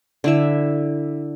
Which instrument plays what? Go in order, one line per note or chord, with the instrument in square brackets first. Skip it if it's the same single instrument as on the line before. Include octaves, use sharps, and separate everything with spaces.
[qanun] D3 E4 E5